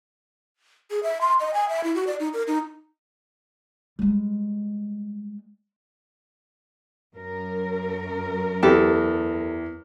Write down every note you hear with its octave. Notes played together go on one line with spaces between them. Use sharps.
G#4
E5
C6
D#5
G#5
E5
E4
F#4
D5
D#4
A#4
D#4
G3 G#3
F#2 A#4
E2 G4 A4